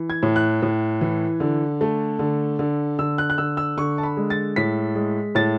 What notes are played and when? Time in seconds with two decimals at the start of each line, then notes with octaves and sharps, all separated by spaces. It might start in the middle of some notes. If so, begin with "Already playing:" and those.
Already playing: E3
0.10 G#6
0.23 A2
0.36 F#6
0.62 A2
1.01 E3
1.40 D3
1.81 A3
2.19 D3
2.59 D3
2.99 D3 E6
3.18 F#6
3.30 F#6
3.38 D3 E6
3.57 E6
3.77 D3 C#6
3.98 A5
4.03 B5
4.17 G#3
4.30 A6
4.56 A2 B6
4.95 G#3
5.35 A2 A6